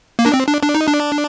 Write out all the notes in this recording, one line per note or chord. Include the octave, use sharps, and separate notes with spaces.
A#3
D4
C4
D4
D4
D#4
D4